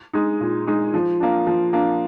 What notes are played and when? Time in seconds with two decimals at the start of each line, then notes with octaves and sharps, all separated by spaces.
0.13 G#3 D#4
0.41 A#2
0.67 G#3 D#4
0.94 F3
1.20 A#3 D4
1.47 F3
1.73 A#3 D4